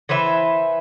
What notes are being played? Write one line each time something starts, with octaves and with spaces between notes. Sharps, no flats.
E3 B4 C5 E5